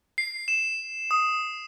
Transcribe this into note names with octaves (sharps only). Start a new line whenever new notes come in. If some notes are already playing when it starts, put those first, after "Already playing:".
C7
E7
D#6